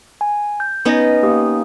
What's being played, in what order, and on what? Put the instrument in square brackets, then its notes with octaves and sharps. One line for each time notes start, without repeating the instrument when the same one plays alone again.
[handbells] G#5
G6
[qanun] B3 C#4 D#4 [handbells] B4 A#6
[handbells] A#3 G4 D#6